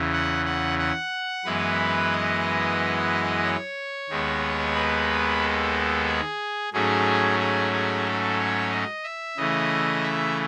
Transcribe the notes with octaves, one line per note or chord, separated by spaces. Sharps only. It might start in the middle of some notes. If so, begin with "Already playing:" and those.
Already playing: E2 C#3 E3
F#5
F#5
F#5
F#2 E3 G#3 B3 B4
D#5
C#5
D#2 D#3 G#3 B3
B4
A4
G#4
G#2 F#3 A3 C#4 G#4
G#4
G#4
A4
C#5
D#5
E5
C#3 E3 A3 D#5
E5